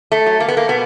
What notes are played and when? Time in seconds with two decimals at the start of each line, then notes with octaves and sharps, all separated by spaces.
0.12 A3
0.26 F#3
0.40 A#3
0.48 B3
0.57 A#3
0.69 B2 B3